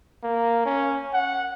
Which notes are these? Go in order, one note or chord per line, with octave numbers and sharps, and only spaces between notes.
A#3
C#4
F#5